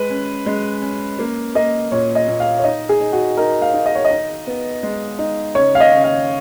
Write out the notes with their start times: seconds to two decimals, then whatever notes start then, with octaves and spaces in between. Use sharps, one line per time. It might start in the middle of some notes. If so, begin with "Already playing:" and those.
Already playing: G#3 B4
0.10 C#4
0.46 G#3
0.82 C#4
1.19 A#3
1.55 A#3 D#5
1.92 A#2 C#5
2.15 D#5
2.28 A#2
2.40 F5
2.59 C#5
2.64 D#4 D#5
2.89 G#4
3.00 D#4
3.13 F#4
3.37 D#4 A#4
3.62 F5
3.74 D#4
3.86 D#5
3.95 C#5
4.05 D#5
4.11 D#4
4.47 B3
4.83 G#3
5.19 D#4
5.55 C#3 C#5
5.75 F5
5.80 D#5
5.92 C#3
6.04 F5